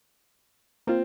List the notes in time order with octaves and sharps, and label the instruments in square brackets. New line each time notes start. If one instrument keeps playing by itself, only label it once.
[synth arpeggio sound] A#3 F4 [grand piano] C4